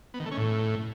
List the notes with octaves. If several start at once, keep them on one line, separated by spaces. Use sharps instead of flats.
B3
D#3
A3
C#4
A2